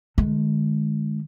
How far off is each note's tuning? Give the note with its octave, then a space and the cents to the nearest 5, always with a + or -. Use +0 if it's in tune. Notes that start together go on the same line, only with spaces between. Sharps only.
D#3 -40 G#3 +20